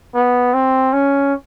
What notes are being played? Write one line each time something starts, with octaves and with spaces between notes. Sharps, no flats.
B3
C4
C#4